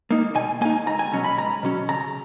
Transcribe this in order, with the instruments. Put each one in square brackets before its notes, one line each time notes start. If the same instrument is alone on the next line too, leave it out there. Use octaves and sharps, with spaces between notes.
[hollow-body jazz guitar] A#3 D#4
B2 G#5
A#3 D#4 G#5
C#2 A#5
G#5
B2 F#3 C#4 A#5
B5
C#2 A#5
B2 F#3 C#4
C#3 A#5